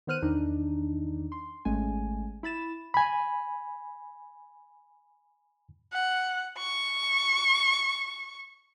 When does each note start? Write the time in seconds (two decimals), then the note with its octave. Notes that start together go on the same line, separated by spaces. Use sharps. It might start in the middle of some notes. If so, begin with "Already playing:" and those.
0.07 D#3 B3 C5 F6 F#6 D#7
0.22 E2 D#3 D4 D#4
1.32 C6
1.65 G#1 G#3 A3 C#4 G#5
2.43 E4 B5 A6 E7
2.94 G#5 B5
5.93 F#5
6.58 C#6